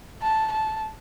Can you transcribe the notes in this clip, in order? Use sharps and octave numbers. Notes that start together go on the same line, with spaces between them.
A5
A5